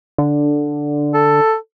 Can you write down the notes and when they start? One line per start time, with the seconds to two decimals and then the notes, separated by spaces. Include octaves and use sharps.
0.18 D3
1.14 A4